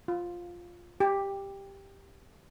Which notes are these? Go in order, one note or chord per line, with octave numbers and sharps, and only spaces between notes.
F4
G4